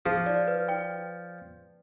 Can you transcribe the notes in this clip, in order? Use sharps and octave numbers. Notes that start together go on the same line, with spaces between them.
F3 G#4
D5
B4
G5